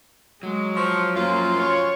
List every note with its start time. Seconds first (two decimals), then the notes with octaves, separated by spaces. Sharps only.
0.43 F#3 G#3
0.76 F3 C#6
1.15 F#2 F3 A#3 F4 C6
1.58 C#5